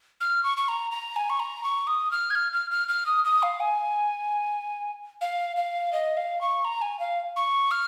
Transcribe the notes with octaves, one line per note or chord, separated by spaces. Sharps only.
F6
C#6
C#6
A#5
A#5
G#5
C#6
A#5
C#6
D#6
F6
G#6
F6
F6
F6
F6
D#6
D#6
F5
G#5
F5
F5
D#5
F5
C#6
A#5
G#5
F5
C#6
F6